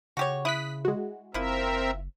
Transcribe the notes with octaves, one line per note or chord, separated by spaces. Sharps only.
C#3 F#4 G4 C#5
E4 D#6 F#6 B6
G#3 F#4
F#1 F3 C4 E4 A#4 E5